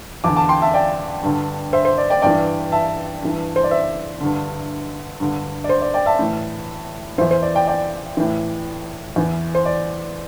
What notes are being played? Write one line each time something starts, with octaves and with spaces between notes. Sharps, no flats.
E2 D3 A5 D6
A5 D6
G5 C6
E5 A5
D5 G5
G2 D3
C5 E5
C5
D5
D5 G5
G2 E3 D5 G5
E5 A5
G2 E3
C5
D5
C5 E5
G2 D3
G2 D3
D5
C5
D5
D5 G5
E5 A5
A2 E3
E2 E3 C5 E5
C5
D5
D5 G5
D5 G5
A2 E3
E2 E3
C5
D5